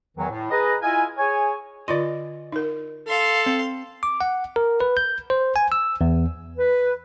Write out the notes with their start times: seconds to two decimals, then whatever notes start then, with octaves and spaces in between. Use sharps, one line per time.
0.17 E2 D#3 E3 F#3
0.30 A2
0.51 G#4 B4 D#5 A#5
0.82 E4 F4 D#5 F5 G#5
1.18 G#4 C#5 G#5
1.88 D3 F4 D5 D#5 C6
2.52 D#4 A#4
3.07 A4 F5 C6
3.46 C4
4.03 D6
4.21 F#5
4.56 A#4
4.81 B4
4.97 G6
5.30 C5
5.56 G#5
5.72 E6
6.01 E2
6.58 B4